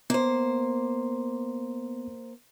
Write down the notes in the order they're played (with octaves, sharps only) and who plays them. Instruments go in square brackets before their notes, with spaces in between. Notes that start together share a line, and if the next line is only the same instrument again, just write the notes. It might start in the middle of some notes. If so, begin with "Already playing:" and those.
[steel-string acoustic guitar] A#3 C5 [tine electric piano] B3